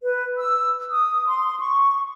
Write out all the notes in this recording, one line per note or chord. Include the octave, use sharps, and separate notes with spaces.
B4
E6
D#6
C6
C#6